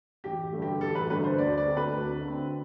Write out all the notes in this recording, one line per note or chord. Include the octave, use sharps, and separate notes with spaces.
A1 G4
G2 D3 A3
G4
A1 A4
B4
G2 D3 A3 B4
C5
D2 D5
D5
D3 A3 C4
B4
D2
D3 A3 C4